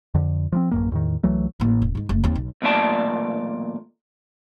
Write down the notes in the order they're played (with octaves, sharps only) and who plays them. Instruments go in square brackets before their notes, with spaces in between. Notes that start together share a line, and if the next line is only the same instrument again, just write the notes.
[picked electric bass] F2 D3
F3 G3 C4
A1 F#2 A#3
E2 A2 D#3
C2 E3 F#3 A3
[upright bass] A1 A#3
E1
G#2 G#3
F#1 A3
D#2 C4
B1
[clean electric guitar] B1 E2 A#2 A3 D5 A5